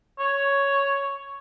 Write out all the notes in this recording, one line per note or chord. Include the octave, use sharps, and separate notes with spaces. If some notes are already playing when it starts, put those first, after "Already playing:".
C#5